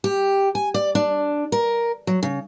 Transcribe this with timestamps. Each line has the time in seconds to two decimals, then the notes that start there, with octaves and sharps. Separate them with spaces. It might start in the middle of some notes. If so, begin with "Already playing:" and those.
0.04 G4
0.55 G#5
0.74 D5
0.95 D4
1.52 A#4
2.07 F#3
2.23 C#3